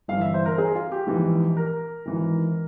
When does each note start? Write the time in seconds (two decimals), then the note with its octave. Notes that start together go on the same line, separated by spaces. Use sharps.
0.08 G1 G2 E3 F5
0.21 E5
0.34 C5
0.46 A#4
0.58 G#4
0.75 F4
0.92 G4
1.07 A#1 G#2 E3
1.57 A#4
2.06 G#1 G#2 E3